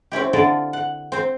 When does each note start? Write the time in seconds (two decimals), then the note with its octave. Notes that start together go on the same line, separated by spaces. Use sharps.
0.12 C4 C#4 E4 G4
0.33 D3 E4 F4 A4 A#4
0.73 F#5
1.12 C4 C5